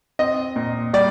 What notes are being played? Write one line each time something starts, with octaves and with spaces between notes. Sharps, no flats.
C4 D#5
A#2
G3 D5